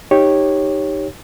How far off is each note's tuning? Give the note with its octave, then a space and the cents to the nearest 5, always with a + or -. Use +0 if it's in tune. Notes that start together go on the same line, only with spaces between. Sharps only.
D#4 +0 G4 +0 C#5 -10